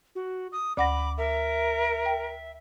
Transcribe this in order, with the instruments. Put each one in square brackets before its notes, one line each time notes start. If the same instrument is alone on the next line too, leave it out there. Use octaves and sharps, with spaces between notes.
[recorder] F#4
D#6
[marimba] D2 F#5 A#6 [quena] B5 [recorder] D6
[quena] A#4 [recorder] E5
[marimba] G5